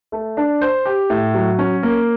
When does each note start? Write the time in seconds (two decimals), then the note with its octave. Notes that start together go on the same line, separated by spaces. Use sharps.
0.12 A3
0.37 D4
0.61 C5
0.85 G4
1.10 A2
1.34 F#3
1.59 C#4
1.83 A#3